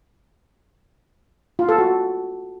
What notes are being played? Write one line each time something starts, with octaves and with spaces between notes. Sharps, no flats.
F4
A4
F#4